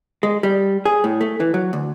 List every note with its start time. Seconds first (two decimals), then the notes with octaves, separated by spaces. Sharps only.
0.23 G#3
0.43 G3
0.85 G#4
1.04 A2
1.21 A3
1.40 E3
1.54 F#3
1.73 D2